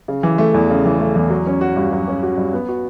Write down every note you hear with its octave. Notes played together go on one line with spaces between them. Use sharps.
C#3
E3
A3
E2
C#3
E3
A3
E2
F#3
C#4
F#4
G2
F#3
C#4
F#4
G2
B3
F#4